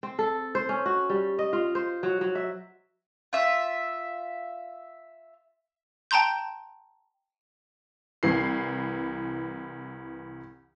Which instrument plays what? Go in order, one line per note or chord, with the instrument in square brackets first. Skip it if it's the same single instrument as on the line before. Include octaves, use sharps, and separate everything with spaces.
[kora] C4
A4
C5
C#4
F#4
G3
D#5
F4
C5
F#3
F#3
E5
[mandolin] F4 E5
[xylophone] G5 A5 A#5 C6 G6
[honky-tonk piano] C2 E3 C7